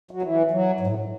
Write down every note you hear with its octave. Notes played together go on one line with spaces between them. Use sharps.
F#3
E3
F#3
G#2
A2